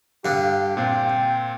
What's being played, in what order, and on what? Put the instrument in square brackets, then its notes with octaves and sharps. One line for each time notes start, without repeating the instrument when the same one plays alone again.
[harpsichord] G2 D3 [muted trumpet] G4 [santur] F5
[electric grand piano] A#2 C4 F4 [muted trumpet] G5